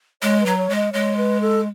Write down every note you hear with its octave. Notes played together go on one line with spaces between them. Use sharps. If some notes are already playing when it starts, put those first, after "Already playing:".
G#3 C#5
B4
F#3
C#5
G#3
D#5
G#3 C#5
B4
A4